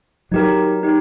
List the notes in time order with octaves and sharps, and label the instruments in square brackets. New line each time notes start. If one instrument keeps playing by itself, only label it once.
[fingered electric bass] F#3 [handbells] D#4 G4 A#4
[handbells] D#4 G4